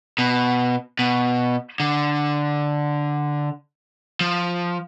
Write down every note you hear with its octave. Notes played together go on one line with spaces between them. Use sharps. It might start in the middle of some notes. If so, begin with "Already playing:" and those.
B2
B2
D3
F3